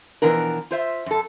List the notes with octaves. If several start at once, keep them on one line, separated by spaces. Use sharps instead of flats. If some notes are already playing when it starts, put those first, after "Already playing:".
B2 E3 F3 B3 D4 A#4
F4 C5 E5
F#2 A4